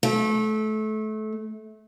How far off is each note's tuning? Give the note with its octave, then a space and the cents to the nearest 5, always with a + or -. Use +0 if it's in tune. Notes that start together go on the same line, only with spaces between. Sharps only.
A3 -25